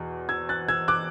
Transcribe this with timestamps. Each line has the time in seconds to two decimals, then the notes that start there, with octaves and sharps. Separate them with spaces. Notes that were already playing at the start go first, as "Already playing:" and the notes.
Already playing: E2 B2
0.29 E6 G#6
0.49 F#6 A6
0.69 E6 G#6
0.88 D6 F#6